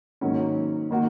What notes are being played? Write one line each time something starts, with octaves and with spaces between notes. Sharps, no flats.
G#2 D#3 F#3 A#3 C#4
D#3 A#3 F#4